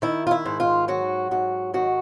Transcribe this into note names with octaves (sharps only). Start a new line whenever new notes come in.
D#3 E4
F4
E4
G#2
F4
F#3 F#4
G#2 F#4
D#3 F#4